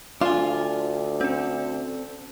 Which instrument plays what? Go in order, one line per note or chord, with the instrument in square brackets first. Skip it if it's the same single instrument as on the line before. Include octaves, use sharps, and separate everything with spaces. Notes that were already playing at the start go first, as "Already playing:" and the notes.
[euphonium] D2 [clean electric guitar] D4 G#5 [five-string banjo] F4
[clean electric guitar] C4 A4 [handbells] C#4